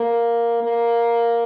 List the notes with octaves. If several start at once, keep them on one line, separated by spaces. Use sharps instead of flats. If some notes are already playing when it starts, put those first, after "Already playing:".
Already playing: A#3
A#3